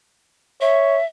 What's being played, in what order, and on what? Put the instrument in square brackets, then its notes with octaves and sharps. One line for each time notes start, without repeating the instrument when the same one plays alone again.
[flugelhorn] C#5 [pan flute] E5